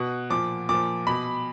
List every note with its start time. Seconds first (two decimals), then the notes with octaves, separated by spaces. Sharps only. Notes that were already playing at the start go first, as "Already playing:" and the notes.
Already playing: B2 F#5
0.30 A#2 F3 D6
0.69 A#2 F3 D6
1.07 B2 B5